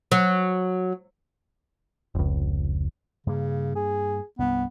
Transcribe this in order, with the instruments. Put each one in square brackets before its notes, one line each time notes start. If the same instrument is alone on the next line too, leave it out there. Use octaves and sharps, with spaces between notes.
[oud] F#3
[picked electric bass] F1 C#2
[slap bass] G2 A#3 [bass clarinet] C#3
[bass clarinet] G#4
[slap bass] C2 G2 [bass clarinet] B3